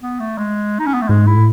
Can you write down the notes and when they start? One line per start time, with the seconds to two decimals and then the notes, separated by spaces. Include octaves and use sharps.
0.02 B3
0.20 A3
0.38 G#3
0.79 D#4
0.86 C#4
0.94 B3
1.02 A3
1.09 G#2 G#3
1.27 E4
1.36 A2